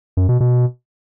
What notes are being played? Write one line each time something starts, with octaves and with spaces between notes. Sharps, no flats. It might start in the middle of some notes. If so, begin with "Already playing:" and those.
F#2
B2
B2